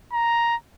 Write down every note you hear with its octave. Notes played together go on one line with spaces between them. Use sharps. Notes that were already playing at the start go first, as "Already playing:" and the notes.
A#5